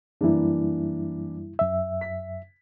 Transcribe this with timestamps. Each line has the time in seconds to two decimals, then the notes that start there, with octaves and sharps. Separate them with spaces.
0.21 F#2 E3 G3 A#3 D4 E4
1.59 F#2 E5
2.01 B6